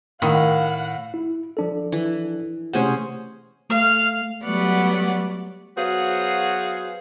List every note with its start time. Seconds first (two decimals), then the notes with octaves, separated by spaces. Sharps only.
0.22 A2 D#3 F5 F#5
1.14 E4
1.57 F3 D4 A4
1.92 E3
2.73 C3 A3 C#4 G#4 C5 F#5
3.70 A3 F5
4.43 F#3 G3 A3 B3 D5 F#5
5.77 F#3 B3 F#4 G#4 C5 F5